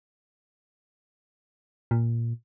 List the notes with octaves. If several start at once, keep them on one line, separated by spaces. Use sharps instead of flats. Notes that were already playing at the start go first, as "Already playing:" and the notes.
A#2